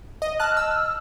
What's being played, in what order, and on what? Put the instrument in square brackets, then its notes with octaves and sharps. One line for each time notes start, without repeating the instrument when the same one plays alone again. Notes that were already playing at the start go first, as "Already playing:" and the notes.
[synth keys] D#5
[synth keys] A5 F#6 [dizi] F6
[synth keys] E6